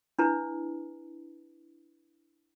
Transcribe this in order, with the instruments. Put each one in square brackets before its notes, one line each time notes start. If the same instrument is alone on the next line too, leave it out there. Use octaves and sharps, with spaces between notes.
[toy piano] D4 E4 B4